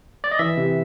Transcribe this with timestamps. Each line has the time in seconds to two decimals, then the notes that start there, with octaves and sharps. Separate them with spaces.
0.24 D5
0.31 D#5
0.39 E3 E5
0.57 C3